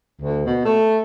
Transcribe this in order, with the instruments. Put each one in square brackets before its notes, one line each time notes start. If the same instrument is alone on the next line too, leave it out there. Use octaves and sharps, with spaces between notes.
[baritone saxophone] D2
B2
A3